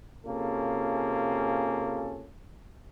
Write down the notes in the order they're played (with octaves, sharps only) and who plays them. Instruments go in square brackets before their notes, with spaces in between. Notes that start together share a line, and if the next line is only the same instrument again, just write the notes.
[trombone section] C3 A#3 C#4 F4 G#4 A4